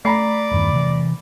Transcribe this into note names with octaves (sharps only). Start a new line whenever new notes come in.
A3 D5 A#5 B5 C7
E2 G2 D#3
C3 E3